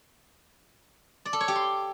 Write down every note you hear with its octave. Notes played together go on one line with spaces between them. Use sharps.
D5
A4
C#5
G4
C6